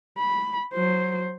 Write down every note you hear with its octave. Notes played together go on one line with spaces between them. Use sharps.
B5
F#3 C5